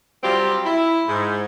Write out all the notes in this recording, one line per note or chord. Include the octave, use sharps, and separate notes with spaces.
F#3 G3 C4 F4 G4
E4
G#2